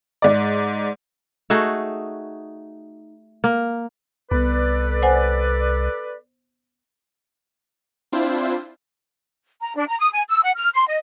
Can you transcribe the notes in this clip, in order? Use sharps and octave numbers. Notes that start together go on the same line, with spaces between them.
G#2 D5
A3 D#4 F#4 G#4
A#3
C2 B3 A4 B4 D5
C5 F#5 G#5
C4 D4 E4 F4 C5
A#5
D4
A#5
D#6
G#5
E6
F#5
F6
C6
D#5